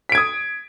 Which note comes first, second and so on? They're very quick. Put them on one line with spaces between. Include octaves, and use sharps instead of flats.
B6 D7 G#6 D#6